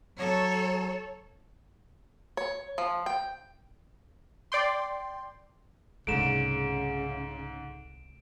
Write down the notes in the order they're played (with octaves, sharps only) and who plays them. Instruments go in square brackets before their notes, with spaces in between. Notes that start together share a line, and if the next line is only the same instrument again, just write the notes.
[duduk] F#3 [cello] A4 C#5
[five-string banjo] C#5
F3
G5
[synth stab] D5 G5 C6
[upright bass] C2 G#3 [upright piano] G#2 A3 [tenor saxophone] C#3 [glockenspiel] D7 E7